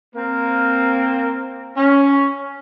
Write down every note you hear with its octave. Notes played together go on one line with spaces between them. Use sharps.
A#3 C4 A#4
C#4